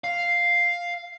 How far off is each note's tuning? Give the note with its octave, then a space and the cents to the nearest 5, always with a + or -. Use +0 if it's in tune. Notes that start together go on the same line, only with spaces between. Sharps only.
F5 +0